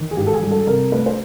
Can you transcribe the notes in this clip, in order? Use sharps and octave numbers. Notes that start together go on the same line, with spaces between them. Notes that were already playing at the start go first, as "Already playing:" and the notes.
Already playing: D#3
G#4
G#2 G4
A4
G#4
G3
A4
C3 A#4
A3 B4
C5